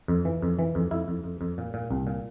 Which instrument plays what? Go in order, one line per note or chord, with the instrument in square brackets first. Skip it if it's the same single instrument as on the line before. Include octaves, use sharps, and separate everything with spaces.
[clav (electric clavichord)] F2
E3
F2
E3
F2
F2 E4
F2
F2
F2
A#2
A#2
C2
A#2